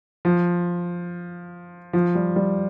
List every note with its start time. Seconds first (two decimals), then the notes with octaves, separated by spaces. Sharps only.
0.25 F3
1.93 F3
2.15 G3
2.36 G3